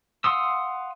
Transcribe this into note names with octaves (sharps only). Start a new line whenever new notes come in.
F5 F#5 C6 D#6 E6